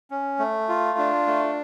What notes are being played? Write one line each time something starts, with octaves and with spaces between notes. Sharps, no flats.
C#4
A3
F4
D4
A3